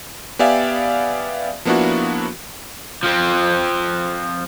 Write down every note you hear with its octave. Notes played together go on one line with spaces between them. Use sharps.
B3 G4 D5 E5 F5 G#5
F3 A#3 B3 D4 E4 F#4
F3 C4